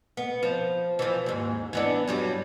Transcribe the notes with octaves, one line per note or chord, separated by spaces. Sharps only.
B3
F3
E3 F3
D#2 G#2
E3 B3 D4
G2 F#3 G3